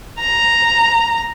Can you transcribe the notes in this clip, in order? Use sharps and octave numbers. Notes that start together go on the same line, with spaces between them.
A#5